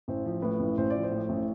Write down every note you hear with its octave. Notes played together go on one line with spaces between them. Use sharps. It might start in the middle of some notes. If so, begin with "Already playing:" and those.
A1 C5
F3
A2 B4
A1
A1 C5
F3 D5
C5
A2
A1